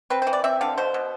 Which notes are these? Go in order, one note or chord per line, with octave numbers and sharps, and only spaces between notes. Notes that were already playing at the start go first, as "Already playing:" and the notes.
C4 B4
C5
E3
D5
C4 E5
D3 F5
B2 C5
B2